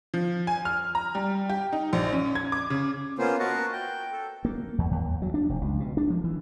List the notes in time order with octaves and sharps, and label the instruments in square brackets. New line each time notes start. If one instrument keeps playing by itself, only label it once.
[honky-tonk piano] F3
G#5
F6
A#5
G3
G4
D#4
A#1
C#4
G#6
D6
C#3
[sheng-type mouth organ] A#3 B3 C#4 F4 C5
F#4 A#4 B4 D#5 A5 C#6
G5
A4
[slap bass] A#3
E2
D#2
F#3
D4
F1
C#2
B2
D4
F3
E3